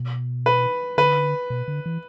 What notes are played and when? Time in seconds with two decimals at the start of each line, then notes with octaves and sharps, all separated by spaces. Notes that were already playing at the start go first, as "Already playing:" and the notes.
Already playing: B2
0.46 B4
0.98 D3 B4
1.50 B2
1.68 D3
1.86 E3